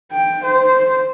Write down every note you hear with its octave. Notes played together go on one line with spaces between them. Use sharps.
G5
C5